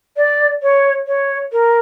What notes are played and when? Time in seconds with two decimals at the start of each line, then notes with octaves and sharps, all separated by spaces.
0.17 D5
0.63 C#5
1.07 C#5
1.52 A#4